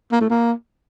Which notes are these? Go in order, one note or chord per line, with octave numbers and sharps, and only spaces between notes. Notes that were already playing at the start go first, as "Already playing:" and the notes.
A#3
A3
A#3